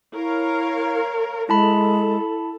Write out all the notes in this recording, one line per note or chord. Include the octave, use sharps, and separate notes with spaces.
E4 A#4 C#5 F5
G#3 E4 A4 A5 B5